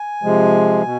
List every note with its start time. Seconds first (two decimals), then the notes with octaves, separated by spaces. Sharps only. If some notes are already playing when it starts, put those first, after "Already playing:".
Already playing: G#5
0.23 C3 F3 G#3
0.83 B2